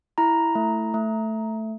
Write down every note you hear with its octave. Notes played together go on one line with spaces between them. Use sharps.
E4 A#5
A3
A3